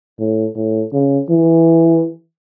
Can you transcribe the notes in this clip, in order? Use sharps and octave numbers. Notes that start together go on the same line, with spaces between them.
A2
A2
C#3
E3